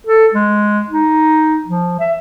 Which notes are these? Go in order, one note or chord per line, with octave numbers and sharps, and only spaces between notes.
A4
G#3
D#4
F3
E5